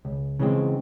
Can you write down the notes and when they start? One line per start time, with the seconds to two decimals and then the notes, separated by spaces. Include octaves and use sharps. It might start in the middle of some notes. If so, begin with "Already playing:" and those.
0.05 C#2
0.39 C#3 E3 G#3 C4